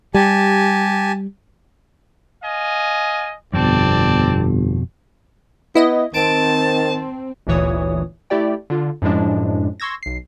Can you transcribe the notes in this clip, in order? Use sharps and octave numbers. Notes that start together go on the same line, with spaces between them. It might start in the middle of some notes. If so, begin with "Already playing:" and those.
G3 G4 G#5 A5
D#5 F5 G#5
G1 F2 B2 C4 D5 A5
B3 E4 D#5
D#3 C4 A5 D7
G1 D2 A#2 E3 C#5 D#6
A3 E4 G4 D5 G5
D3 F4
F#2 A2 F3 G#3 D4
C6 C#6 E6 G#6 A#6
B1 C7